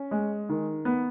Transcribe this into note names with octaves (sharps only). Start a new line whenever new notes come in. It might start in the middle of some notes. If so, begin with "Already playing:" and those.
Already playing: C#4
G#3
D#3
B3